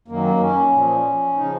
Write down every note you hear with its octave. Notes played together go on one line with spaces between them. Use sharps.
F#2 D#3 F#3 A#3
C#4
A#2
F3
C#3 F3 D#4